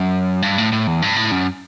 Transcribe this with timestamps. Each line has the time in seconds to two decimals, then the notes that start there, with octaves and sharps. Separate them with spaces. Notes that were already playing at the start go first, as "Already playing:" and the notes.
Already playing: F#2
0.42 G2
0.58 A2
0.72 A2
0.87 E2
1.02 G2
1.16 A2
1.31 F#2